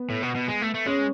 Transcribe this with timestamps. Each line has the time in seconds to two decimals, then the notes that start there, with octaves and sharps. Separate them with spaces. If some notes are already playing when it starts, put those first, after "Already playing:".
Already playing: B3
0.10 A2
0.23 B2
0.35 B2
0.48 G#3
0.62 A3
0.74 A3
0.86 G#3 C#4